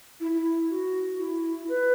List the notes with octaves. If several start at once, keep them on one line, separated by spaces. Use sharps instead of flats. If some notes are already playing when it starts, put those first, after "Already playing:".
E4
E4
F#4
E4
B4